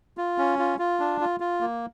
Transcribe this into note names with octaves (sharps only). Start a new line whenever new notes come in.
F4
C#4
F4
F4
D4
F4
F4
A#3